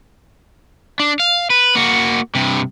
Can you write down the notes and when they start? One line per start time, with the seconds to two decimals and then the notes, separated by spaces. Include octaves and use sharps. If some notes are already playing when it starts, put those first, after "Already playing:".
1.00 D4
1.20 F5
1.50 B4
1.75 A#3 F#4
2.35 G2 C3